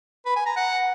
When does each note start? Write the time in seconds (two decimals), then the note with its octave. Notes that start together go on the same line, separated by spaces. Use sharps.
0.26 B4
0.36 G#5
0.46 A#5
0.56 F#5